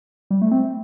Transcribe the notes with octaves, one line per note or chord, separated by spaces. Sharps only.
G3
A3
C4